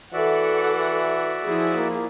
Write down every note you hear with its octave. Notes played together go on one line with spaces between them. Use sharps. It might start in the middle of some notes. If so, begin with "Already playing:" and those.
E3 F#4 A4 D5 E5 F#5
F3 E4 G#4
A#3